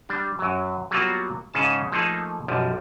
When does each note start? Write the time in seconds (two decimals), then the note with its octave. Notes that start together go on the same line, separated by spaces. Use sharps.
0.09 G3 D4
0.39 F#2 F#3
0.91 F#3 G3 A#3 B3 F4 F#4
1.54 G#2 C#3 C#4 G#4 A5
1.92 F3 A3 A#3 D#4 G#4 A4
2.48 B1 F#2 F3 G3